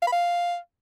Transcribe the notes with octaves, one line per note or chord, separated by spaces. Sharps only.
F5
B5
F5